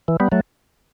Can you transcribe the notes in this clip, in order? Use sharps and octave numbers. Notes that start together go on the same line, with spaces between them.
E3
G3 B3
F#3 A3